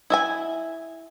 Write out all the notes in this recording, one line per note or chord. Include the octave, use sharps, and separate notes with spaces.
E4 E5 G#5